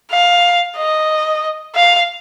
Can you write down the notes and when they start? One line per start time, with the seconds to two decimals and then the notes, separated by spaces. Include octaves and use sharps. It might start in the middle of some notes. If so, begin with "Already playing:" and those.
0.11 F5
0.77 D#5
1.75 F5